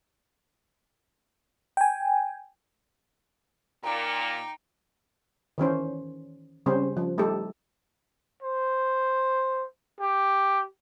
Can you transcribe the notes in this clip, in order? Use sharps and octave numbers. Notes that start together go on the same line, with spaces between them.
G5 G#5
A#2 D#4 G5 A#5 D6
D#3 E3 C#4 C5
C#3 G3 C4 C#4 C5
F3
G3 A3 D#4 G4 A4
C5
G4